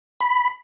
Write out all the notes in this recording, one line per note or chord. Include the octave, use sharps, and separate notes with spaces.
B5